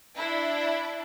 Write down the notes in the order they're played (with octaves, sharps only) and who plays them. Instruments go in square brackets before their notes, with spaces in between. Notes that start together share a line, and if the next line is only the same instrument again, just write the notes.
[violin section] D4 E4